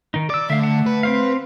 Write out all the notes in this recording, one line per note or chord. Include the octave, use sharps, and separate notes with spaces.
D#3 D#4
D5 D6 E6
D3 A3 E5 F5
F#5 A5
B4
C4 C5 F5